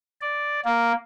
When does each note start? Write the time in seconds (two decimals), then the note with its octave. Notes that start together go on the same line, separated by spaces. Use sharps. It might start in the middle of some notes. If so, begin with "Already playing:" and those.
0.21 D5
0.64 A#3